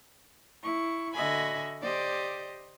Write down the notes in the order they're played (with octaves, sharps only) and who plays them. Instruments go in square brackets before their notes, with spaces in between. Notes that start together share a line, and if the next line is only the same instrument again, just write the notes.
[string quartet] E4 C#6
D3 F#4 D#5 E5 G#5 B5
G4 C5 D5 D#5